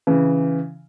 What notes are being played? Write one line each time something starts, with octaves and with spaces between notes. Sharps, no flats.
C#3 E3